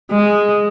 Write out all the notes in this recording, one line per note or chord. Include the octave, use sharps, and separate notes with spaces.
G#3